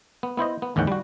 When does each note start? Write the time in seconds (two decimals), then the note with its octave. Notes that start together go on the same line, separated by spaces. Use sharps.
0.23 B3
0.37 B3 E4 C5 D#5
0.62 B3
0.76 A1 E2 D#3 C#4 F#5 G5
0.87 G3 F#4